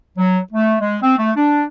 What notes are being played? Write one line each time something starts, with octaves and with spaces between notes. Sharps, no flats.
F#3
A3
G#3
C4
A3
D4